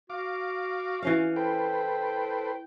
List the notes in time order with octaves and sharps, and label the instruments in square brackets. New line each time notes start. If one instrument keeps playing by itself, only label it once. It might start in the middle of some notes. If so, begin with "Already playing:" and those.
[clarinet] F#4 [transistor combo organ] F5 D6
[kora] E3 C#4 F5
[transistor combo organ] A4 B4 C5 [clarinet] G5